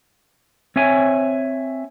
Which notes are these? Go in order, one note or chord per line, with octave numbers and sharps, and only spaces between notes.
C4 C#5 E5 G#5